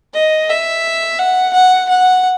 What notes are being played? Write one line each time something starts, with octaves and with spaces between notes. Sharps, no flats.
D#5
E5
F#5
F#5
F#5